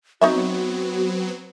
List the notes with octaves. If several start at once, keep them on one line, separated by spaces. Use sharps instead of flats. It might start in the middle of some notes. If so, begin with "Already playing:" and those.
F#3 B3 C4 D#4 F#4 C#5 E5